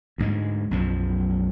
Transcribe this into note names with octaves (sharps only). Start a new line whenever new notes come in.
D2 G#2 G#3
B1 F#2 F3